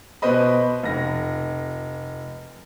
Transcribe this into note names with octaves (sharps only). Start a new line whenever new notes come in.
B2 B4 C5 D#5 B5
F1 A#6